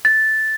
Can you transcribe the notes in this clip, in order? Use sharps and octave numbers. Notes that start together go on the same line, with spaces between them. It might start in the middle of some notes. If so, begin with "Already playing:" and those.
A6